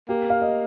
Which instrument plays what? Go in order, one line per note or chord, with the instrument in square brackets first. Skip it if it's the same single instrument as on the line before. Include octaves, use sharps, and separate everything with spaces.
[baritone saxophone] A#3 [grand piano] G4
[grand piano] F5
D#5